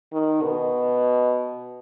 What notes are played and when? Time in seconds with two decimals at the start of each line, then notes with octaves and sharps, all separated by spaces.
0.13 D#3
0.43 B2